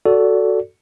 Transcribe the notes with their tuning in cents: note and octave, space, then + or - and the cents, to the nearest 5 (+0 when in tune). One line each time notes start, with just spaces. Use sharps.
F#4 +0 A4 +0 D5 -25